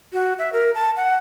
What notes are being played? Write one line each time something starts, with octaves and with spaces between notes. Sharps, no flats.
F#4
E5
A#4
A5
F#5